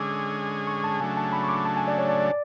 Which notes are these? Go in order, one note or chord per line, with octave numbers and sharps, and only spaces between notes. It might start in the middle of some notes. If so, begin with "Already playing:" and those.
Already playing: D3 G#3 C#4 G#4 D6 E6
C#6
A5
C#3 F#3 A3 D4 G#5
A5
B5
C#6
D6
A5
G#5
D5
C#5
D5
D5